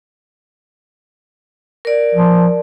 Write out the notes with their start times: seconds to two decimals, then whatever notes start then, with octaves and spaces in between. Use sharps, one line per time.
1.85 A#4 D5
2.15 F3